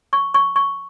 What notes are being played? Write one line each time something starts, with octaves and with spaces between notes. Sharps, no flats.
C#6
C#6
C#6